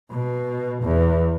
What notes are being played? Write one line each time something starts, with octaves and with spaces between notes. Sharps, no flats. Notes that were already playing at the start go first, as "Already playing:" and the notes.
B2
E2